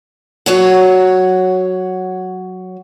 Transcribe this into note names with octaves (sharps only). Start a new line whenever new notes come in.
F#3 C#5 F#5